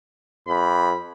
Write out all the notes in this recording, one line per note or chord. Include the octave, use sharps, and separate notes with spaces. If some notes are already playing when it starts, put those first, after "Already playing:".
F2 B5